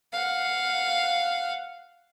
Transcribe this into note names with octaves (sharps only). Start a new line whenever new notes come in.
F5 F#5